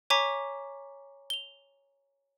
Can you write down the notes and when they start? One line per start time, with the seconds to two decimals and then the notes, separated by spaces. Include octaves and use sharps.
0.10 C#5 G#5 A#5 C#6 D6 B6
1.30 F7 G7